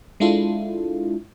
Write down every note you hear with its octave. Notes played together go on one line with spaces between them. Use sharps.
G#3 D4 E4 F4 A4